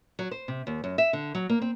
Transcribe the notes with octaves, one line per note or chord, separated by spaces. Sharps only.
F#3
C5
C3
D#2
F#2
E5
D3
F#3
A#3
C4